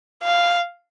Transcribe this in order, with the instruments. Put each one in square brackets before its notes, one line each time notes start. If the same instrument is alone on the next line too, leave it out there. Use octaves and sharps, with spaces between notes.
[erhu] F5